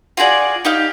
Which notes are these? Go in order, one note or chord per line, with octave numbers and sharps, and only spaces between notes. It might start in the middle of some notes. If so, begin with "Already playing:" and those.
F4 F#4 G#4 D5
D#4 G4 F5